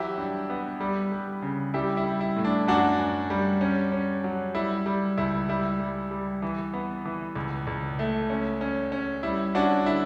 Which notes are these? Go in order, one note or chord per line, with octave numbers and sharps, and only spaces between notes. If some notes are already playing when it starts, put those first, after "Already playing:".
Already playing: E3 F#3 E4 G4
G2
B3
G3
G3
C#3
G3 E4 G4
E4
G3
E4
A2
D4
F#2 D4 F#4
F#2
G3
C#4
C#4
F#3
G3 E4
G3
C#2 E4
G3 E4
G3
G3
E3
B3
E3
C#2
C#2
A3
C#4
C#4
C#4
G3 E4
C#4 D4 F#4
D3 E4